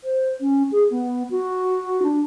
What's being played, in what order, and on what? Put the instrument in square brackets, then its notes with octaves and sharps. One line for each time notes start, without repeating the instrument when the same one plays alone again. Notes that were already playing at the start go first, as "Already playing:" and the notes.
[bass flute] C5
C#4
G#4
B3
F#4
D4